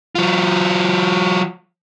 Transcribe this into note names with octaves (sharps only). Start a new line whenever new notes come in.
F#3 F4